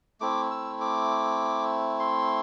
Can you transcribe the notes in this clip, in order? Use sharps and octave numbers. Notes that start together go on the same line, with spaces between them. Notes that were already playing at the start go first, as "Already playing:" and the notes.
A3 C4 E4 D6
E6
D6
C6